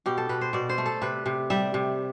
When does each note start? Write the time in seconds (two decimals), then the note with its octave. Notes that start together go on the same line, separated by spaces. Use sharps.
0.06 B2 G4
0.18 A4
0.29 B2 B4
0.41 C5
0.53 B2 D5
0.69 C5
0.78 A3
0.86 A4
1.02 C3 B4
1.26 C3
1.50 G3 E5
1.74 C3